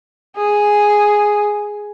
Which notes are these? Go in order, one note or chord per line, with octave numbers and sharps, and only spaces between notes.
G#4